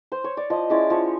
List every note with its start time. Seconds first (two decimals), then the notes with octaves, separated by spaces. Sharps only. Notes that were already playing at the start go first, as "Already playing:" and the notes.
0.12 C5
0.24 C#5
0.37 D5
0.50 F3 D#5
0.70 G#3 C#4 E4 D5
0.90 F3 C#5